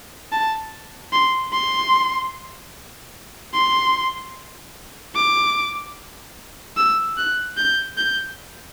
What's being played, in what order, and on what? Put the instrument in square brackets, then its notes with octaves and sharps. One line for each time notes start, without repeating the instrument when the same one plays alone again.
[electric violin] A5
C6
C6
C6
D6
E6
F#6
G6
G6